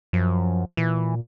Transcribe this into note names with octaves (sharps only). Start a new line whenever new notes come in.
F#2 F3
A#2 E3